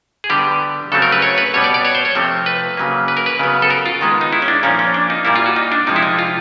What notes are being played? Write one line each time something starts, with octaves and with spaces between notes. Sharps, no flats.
G#4
D3 G3 B3 G4
C#3 F#3 A3 C4 A4
A#4
B4
C#5
B4
B2 G3 B3 C#5
D5
D5
C#5
C5
C#5
C3 F3 A3 C4
B4
C#3 F#3 A#3
B4
A#4
B4
C#3 F#3 B3
A4
A#4
F4
D#3 G#3 B3
D#4
E4
C#4
D4
A#2 F3 A#3 C#4
C#4
D4
D#4
A#2 G3 A#3 E4
F4
F#4
D#4
D4
C3 F3 G#3 D#4
E4
D#4
F4